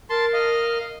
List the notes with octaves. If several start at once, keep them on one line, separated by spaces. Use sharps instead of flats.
A#4 A5 C6
D#5 F5